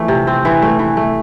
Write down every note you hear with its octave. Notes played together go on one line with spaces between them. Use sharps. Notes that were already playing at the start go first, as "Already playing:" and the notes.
Already playing: E3 F3 A3
C3
C4
E3
A3
E3
A3